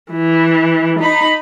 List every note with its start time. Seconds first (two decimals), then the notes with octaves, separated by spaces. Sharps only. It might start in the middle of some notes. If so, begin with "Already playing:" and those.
0.12 E3
1.00 D#4 B5